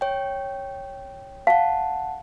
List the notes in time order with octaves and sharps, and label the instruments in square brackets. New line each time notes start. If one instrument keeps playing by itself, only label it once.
[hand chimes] C#5 G5
[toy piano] F5 [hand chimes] F#5 A5